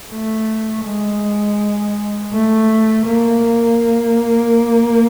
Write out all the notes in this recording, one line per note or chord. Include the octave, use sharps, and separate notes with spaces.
A3
G#3
A3
A#3